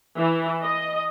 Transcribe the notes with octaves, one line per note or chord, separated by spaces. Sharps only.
E3
D#5